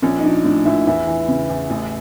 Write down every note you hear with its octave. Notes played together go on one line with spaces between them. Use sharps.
A#1 C#4
D#4
F3 D4
A2 D4
A#1 E4
E2 E4
E3
C#3
E2
A1